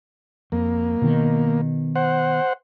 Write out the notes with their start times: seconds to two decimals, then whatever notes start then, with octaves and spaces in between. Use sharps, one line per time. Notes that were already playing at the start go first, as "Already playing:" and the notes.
0.52 F2 A#3
1.02 B2 D#3
1.96 C5 F#5